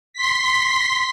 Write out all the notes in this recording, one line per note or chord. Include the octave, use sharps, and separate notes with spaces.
C6 B6